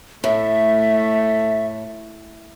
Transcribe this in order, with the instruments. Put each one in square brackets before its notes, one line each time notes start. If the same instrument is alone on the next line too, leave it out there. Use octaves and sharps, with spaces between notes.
[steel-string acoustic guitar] A2 [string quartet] A3 [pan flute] E5